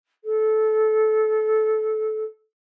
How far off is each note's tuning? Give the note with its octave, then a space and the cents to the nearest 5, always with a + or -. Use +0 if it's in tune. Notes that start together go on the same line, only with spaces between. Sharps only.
A4 -20